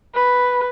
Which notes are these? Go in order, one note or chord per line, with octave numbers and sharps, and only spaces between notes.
B4